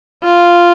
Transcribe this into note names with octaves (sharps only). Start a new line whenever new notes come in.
F4